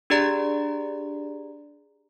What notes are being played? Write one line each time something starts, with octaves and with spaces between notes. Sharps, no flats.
D4 G4 G#4 D5 A#5